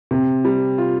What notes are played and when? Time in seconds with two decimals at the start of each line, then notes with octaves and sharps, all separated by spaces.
0.11 C3
0.45 G3
0.78 F4